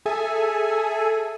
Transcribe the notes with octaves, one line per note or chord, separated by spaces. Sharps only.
G#4 A4 E5 G#5